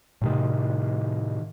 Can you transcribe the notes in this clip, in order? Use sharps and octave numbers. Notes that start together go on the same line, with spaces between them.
A2 C3 D#3